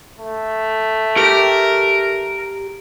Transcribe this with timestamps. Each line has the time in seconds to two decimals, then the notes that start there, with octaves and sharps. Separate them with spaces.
0.18 A3
1.17 G4 A#4